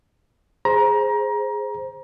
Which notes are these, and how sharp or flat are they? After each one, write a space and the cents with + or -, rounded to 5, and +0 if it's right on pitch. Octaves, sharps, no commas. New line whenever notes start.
G#4 +0 C5 +0 A#5 +25